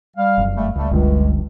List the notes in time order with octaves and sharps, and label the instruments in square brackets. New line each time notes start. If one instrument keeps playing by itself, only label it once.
[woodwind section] G3 F5
[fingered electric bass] F1 F#2
[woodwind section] G3 A3
[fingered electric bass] C#2 [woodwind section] G3 A3
[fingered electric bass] F#1 D3 G3 [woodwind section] C#2